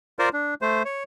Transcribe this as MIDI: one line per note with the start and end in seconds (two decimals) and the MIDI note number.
0.19 0.29 65
0.19 0.29 70
0.19 0.29 72
0.19 0.29 74
0.33 0.54 62
0.62 0.83 57
0.62 0.83 72
0.85 1.03 73